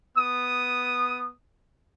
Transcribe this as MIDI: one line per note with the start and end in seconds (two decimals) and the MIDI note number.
0.17 1.31 59
0.17 1.31 87